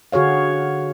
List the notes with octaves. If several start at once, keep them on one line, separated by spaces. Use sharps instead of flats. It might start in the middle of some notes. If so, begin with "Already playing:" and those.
D3 F#4 G#4 C#5 F5